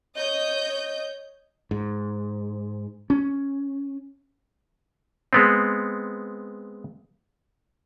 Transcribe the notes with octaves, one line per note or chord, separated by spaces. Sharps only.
C#5 D#5 G6
G#2
C#4
G#3 B3 C4